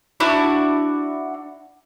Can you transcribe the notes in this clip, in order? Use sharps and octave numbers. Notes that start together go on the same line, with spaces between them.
D4 E4 F#4